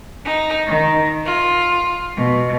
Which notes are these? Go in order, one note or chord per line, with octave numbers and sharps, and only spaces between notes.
D#4
D#3
F4
B2